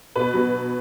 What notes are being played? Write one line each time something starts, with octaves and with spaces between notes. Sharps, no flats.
B2 B4
F#3